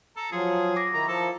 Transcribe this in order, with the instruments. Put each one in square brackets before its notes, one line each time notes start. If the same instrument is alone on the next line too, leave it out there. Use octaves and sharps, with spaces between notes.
[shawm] A4 [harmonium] A#5
[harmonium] F3 F#3 F4 [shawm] G#4
[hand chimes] D6 A#6
[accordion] D#3 A#5 [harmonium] E4
[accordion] F3 [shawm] A4